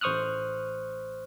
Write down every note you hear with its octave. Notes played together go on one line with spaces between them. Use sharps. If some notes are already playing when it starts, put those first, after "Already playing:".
A1 C5 C#6 D#6 F6 F#6